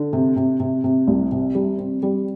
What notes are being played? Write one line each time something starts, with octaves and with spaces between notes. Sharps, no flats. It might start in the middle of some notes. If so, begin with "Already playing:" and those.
Already playing: D3
C3
C3
C3
C3
C2
C3
G3
C4
G3